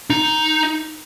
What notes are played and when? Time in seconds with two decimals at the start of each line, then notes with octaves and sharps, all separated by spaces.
0.10 D#4